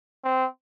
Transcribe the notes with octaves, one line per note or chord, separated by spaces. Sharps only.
C4